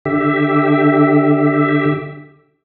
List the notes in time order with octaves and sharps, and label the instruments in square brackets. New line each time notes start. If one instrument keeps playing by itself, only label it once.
[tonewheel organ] D3 G4 E5